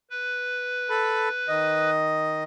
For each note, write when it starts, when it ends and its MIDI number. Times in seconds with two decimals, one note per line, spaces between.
0.10 1.90 71
0.90 1.29 69
0.90 1.29 83
1.48 2.44 51
1.48 2.44 75